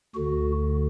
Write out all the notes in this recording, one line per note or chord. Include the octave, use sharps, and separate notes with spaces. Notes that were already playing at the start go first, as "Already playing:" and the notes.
D2 D3 F#4